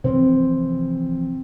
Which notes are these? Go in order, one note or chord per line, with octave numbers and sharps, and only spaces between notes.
C3 E3 F3 C4